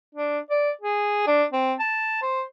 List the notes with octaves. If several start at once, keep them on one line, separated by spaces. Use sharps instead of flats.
D4
D5
G#4
D4
C4
A5
C5